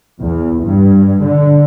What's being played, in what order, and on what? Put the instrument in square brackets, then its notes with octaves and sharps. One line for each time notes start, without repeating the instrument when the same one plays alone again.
[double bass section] E2
G2
D3